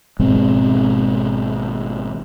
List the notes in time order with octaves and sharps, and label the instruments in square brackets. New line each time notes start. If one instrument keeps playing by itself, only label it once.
[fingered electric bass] G#1 B2 G#3 C4